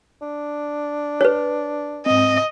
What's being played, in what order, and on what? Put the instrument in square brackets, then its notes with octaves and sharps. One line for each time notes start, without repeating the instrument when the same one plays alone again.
[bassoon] D4
[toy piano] B4 C#5
[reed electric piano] G#2 C4 [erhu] D#5